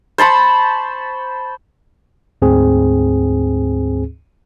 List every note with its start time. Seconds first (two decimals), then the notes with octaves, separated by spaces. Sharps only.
0.18 C5 A5 B5 C#6
2.42 D2 G#2 C4 G#4